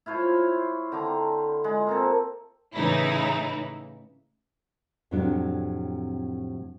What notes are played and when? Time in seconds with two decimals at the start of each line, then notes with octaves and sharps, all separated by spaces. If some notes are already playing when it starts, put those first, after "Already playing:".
0.06 E4 F4 C5 C#5
0.92 D3 G5 A#5 D6
1.64 G#3
1.87 A#3 C4 A4
2.75 A2 C#3 E3 D#4 E4
5.11 F2 A2 C3 F#3 D4